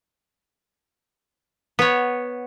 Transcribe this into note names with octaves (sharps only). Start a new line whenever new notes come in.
B3 C#5